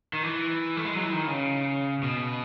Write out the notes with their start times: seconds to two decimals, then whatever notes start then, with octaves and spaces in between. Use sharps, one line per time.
0.13 D#3
0.23 E3
0.77 A3
0.85 G#3
0.95 F#3
1.03 E3
1.13 D#3
1.27 C#3
2.03 B2